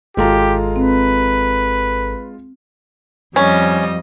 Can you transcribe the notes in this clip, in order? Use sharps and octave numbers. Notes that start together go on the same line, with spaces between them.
G#1 G#3 F4 G4 A4 A#5
C4 B4
F2 G3 C#4 D#5